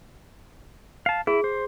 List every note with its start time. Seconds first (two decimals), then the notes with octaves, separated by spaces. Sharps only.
1.06 F5 A5
1.27 E4 G#4
1.44 C5